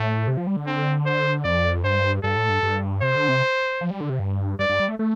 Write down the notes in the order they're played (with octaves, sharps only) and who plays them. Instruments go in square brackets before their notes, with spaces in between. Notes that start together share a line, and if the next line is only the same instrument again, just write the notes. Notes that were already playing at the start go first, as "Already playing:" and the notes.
Already playing: [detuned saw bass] A2 [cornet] A3
[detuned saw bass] C3
F3
G3
D3
[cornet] C4
C5
[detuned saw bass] F2 [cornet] D5
[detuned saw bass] G2 [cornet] C5
[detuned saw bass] G2 [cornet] A4
[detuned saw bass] A2
G2
G2
[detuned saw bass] C3 [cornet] C5
[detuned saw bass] D3
C3
F3
G3
D3
C3
G2
[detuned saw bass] G2 [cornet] D5
[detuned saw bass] G2
G3
A3
A3